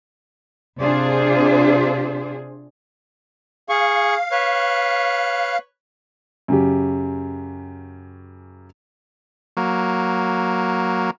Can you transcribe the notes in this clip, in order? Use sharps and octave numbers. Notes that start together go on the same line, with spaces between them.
C3 D4 F4 G#4 C5
G#4 F5 C#6
B4 C#5
F#2 C#3 G4
F#3 A#3